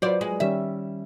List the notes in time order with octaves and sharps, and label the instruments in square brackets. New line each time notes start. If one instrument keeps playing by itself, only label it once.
[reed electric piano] F#3 F4 B4 [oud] C5 D5
[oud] G#3
[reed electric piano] D#3 G3 C#4 [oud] E5